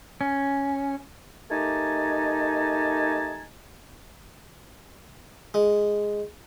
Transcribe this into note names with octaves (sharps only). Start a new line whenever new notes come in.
C#4
A3 D#4 G4 A#4 G#5 A5
G#3